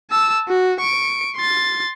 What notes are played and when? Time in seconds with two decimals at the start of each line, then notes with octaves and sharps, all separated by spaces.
0.10 A5 E6
0.48 F#4
0.80 C#6 D7
1.37 C6 A6